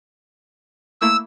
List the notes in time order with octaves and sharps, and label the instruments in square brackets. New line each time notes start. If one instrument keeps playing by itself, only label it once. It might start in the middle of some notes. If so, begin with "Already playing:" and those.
[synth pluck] A3 A#3 E4 [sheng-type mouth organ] E6